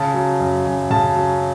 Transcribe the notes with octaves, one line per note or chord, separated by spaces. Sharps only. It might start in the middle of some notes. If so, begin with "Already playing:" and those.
Already playing: C#3 A5
F#3
F#2
F#2
C#3 A5
F#3